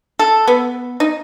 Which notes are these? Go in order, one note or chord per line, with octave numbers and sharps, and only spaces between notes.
A4
B3
D#4